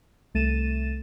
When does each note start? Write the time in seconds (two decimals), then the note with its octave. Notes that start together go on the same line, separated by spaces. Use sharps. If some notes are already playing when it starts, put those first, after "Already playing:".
0.34 C2 A3 A6 D#7 E7